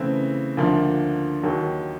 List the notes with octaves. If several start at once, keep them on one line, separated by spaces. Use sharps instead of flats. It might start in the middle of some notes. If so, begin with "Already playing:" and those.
Already playing: C#3 E3 A3 C4 E4
D2 D3 F3 A#3
D#2 D#3 F#3